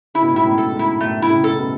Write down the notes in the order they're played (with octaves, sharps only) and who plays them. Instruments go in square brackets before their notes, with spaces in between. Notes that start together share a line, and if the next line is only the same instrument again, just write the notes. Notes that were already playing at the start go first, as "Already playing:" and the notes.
[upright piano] C#3 [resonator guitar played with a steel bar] E4
[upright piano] B2
A2
[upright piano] G#2 B2 [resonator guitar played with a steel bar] E4
[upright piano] F#2 A2
[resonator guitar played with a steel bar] A4
[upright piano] G#2
[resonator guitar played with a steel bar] E4
[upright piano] F#2 A2 [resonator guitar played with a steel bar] A3
[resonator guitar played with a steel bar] E4
[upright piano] A2 C#3
[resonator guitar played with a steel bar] A4
[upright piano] C#3
B2